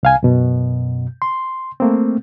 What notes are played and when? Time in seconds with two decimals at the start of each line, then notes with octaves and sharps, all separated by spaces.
0.03 C2 F5 G#5
0.23 F#2 B2
1.22 C6
1.80 A3 A#3 C4